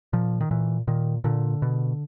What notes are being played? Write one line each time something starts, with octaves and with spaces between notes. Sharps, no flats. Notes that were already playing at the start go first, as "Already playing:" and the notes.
A#2 F3
D#3
A#2 E3
A#2 D#3
A#2 D3
B2